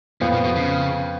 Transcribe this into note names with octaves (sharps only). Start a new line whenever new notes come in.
F2 A#2 F3 B3
A#2
B2
C#3